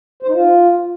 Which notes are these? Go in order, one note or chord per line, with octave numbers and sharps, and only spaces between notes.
C5
D#4
F4